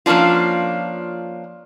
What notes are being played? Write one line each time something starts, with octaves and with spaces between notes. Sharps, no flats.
F3 A#3 C#4 D4 F4